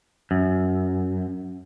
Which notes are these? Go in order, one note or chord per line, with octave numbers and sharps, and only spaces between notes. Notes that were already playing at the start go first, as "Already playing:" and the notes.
F#2